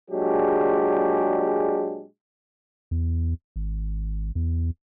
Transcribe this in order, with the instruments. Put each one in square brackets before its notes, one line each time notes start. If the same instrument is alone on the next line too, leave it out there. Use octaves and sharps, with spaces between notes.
[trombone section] A#2 F#3 G#3 D4 G4 G#4
[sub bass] E2
G#1
E2